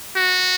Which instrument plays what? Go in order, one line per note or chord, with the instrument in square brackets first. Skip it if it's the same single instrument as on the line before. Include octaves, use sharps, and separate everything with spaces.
[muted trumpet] F#4